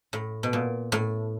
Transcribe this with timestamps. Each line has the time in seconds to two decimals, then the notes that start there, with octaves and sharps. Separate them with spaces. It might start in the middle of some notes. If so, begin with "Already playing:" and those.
0.13 A2
0.43 B2
0.53 A#2
0.92 A2